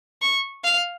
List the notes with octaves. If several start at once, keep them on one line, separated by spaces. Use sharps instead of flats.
C#6
F5